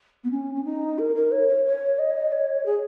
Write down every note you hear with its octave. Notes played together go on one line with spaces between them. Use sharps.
B3
C#4
C#4
D#4
A#4
A#4
C#5
C#5
C#5
D#5
C#5
G#4